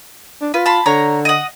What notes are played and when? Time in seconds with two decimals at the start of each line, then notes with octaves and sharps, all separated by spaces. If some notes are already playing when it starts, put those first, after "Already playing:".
0.41 D4
0.54 F4 B4
0.66 A5 B5 C6
0.86 D3 C#5 A#5
1.25 D#5 F#5